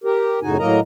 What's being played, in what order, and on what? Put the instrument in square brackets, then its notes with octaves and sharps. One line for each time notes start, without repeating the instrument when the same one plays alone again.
[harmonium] G4 A#4
F#2 A2 C#3 D#4 F#4 G#5
A2 F#3 A#3 A#4 D#5 A#5